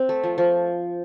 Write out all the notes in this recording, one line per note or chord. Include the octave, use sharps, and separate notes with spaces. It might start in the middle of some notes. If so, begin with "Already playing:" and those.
Already playing: C4
A3
F3
F3